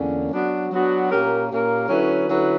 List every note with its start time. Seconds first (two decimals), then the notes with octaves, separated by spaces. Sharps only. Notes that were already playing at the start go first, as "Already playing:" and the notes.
Already playing: E2 D3 A#3 C#4
0.31 F#3 B3 D4 F#4
0.70 F#3 B3 D4 F#4
1.10 A#2 A#3 C#4 G4 A#4
1.49 A#2 A#3 C#4 G4 A#4
1.88 D3 F#3 C#4 E4 B4
2.28 D3 F#3 C#4 E4 B4